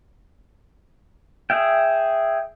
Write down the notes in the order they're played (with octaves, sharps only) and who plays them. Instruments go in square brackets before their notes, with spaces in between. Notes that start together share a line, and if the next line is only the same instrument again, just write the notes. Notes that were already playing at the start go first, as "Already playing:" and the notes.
[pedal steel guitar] G#4 E5 G5